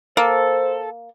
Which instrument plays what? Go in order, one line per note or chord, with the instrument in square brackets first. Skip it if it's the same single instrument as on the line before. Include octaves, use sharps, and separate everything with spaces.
[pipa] A#3 [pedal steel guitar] A4 [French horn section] C5